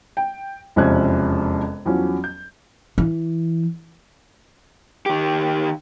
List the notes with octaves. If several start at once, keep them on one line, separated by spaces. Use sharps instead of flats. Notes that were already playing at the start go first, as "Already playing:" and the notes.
G5
E1 F2 C3 C#4 F#6 G#6
E2 F3 F#3 C#4
G6
E3
D#3 G4